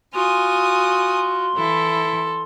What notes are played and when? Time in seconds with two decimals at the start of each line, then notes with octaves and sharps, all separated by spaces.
0.14 F4 F#4 G#5 C6 D#6
1.56 E3 E4 A4